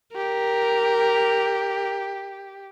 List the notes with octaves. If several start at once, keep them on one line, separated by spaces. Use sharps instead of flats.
G4 A#4